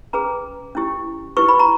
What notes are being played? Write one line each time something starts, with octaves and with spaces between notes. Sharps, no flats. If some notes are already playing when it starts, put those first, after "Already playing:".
C#4 G#4 B4 A#5
C#4 E4 G4
E4 G4 B4 C#6
B5
A#5